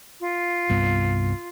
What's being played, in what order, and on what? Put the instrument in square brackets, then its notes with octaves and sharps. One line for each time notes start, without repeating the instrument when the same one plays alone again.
[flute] F4
[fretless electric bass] C2 G2 B3